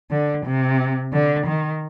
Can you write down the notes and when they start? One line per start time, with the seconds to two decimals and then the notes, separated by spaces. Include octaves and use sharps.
0.11 D3
0.46 C3
1.13 D3
1.46 D#3